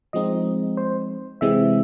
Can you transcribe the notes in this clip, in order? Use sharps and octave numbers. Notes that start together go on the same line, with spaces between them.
F3 G#3 C4 D#4 D#5
C5
C3 E3 G#3 C4 E5